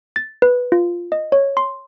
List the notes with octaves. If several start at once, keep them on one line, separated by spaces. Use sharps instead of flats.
A6
B4
F4
D#5
C#5
C6